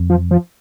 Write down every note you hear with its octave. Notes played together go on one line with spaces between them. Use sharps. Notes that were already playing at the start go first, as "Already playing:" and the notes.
Already playing: F2
F3
F3